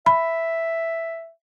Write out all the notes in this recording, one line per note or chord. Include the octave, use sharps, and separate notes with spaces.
E5 B5